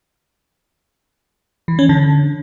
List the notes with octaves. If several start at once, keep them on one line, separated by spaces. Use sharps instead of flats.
E3
C#4
D3